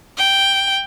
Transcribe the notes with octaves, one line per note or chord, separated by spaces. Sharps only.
G5